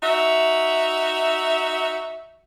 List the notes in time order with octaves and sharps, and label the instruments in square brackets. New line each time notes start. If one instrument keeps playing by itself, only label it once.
[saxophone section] D#4 F#4 E5